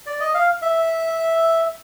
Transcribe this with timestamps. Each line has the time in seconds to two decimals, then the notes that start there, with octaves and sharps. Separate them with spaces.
0.06 D5
0.20 D#5
0.34 F5
0.62 E5